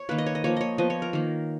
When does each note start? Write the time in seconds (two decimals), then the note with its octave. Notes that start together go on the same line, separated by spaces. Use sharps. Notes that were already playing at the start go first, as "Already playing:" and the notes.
Already playing: C#5
0.09 D#3 A#3 B4
0.18 D#5
0.26 C#5
0.35 D#5
0.44 F3 A#3 C#5
0.57 C#5 D#5
0.78 F3 B3 D#5
0.90 C#5
1.02 A#4
1.13 D#3 A#3